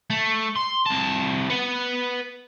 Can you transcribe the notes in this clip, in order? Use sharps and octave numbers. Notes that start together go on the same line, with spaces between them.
A3
C6
C2 A5
B4 F#5